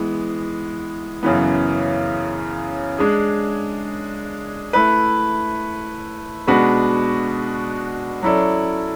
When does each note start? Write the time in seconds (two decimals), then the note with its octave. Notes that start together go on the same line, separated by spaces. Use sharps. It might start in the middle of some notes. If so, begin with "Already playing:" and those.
Already playing: E3 G#3 B3
1.23 F#2 C#3 E3 B3
2.98 G#3 D4 G#4
4.73 A3 E4 B4
6.47 B2 G#3 D4 F#4 B4
8.22 F#3 C#4 E4 A4 D5